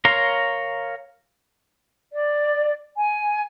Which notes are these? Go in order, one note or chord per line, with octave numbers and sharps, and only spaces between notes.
A#4 C#5 F5 A#5 C6
D5
G#5